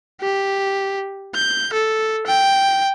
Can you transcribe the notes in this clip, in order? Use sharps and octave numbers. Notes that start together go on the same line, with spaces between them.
G4
G6
A4
G5